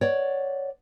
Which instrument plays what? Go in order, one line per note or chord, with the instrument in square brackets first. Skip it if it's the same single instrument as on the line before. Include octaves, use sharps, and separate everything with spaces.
[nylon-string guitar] C#5 D5 F#5